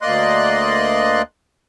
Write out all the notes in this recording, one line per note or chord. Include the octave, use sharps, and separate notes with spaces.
D2 A#3 D5 D#5 C6 F#6